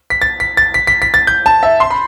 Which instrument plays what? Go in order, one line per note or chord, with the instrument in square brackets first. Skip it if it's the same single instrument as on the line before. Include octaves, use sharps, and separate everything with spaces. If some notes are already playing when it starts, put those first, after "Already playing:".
[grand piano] B6
A6
B6
A6
B6
B6
B6
A6
G6
A5
E5
C6
B5